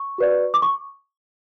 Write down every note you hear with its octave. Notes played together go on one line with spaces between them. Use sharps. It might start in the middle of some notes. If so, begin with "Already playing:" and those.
Already playing: C#6
F#4 B4 D5
D6
C#6